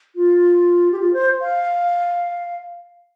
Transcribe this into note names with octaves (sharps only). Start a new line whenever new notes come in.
F4
G4
F4
C5
F5